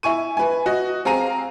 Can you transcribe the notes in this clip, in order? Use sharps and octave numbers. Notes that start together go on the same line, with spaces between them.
E4 G#5 C#6 D#7
B4 G#5
F#4 D#5
C4 G#4 F5 A#5 D#7